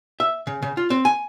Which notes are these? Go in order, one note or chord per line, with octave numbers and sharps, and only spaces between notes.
E5
C#3
C#3
F4
C4
G#5